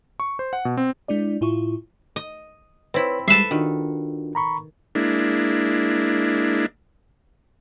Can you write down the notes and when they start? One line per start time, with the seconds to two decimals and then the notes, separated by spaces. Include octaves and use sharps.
0.20 C#6
0.39 C5
0.53 F#5
0.65 B2
0.77 C4
1.08 G#3 D4 E4 D5
1.41 A2 E4 F4 C#6
2.16 D#5
2.94 C4 E4 B4 C#5
3.28 G3 G#3 A4 B4 E5 C7 E7
3.51 D#3 D4 F4 F#4
4.35 A#5 B5 C#6
4.95 G#3 A#3 D4 E4